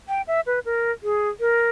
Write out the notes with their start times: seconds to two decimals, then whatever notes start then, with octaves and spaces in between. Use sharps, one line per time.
0.09 G5
0.27 E5
0.46 B4
0.65 A#4
1.03 G#4
1.40 A#4